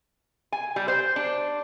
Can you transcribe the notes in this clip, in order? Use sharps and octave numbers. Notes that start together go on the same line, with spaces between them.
G#5
G3
C5
D4